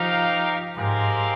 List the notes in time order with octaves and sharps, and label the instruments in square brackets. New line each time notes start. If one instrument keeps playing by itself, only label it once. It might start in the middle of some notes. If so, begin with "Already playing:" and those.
Already playing: [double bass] F3 [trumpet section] D#4 G4 A#4 F5
[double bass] G#2 [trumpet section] G#3 C4 G4 A#4 F5